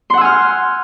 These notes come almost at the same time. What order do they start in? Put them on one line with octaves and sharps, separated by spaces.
C6 F#5 E6 G#5 F6